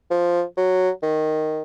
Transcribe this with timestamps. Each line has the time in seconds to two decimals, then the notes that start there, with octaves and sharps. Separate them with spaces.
0.11 F3
0.57 F#3
1.03 D#3